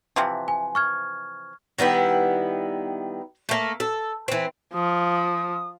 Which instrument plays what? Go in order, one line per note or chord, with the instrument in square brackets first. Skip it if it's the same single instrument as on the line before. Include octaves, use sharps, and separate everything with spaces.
[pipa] C3 E3 F3
[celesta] G#5
C#6 F6 G#6
[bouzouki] D#3 G3 B3 E4
A3 A#3
A4
E3 C4
[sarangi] F3 [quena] D#6